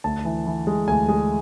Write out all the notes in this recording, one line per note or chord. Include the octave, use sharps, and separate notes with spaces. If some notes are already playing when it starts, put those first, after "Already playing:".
D2 A5
E3
E3
G#3
D2 G#5
G#3